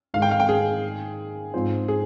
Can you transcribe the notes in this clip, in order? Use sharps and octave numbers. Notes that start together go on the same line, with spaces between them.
G#2 D#3 G#3 F5
G5
F5
G5
G#4
G#2 F3 C4 F4 C5
G#4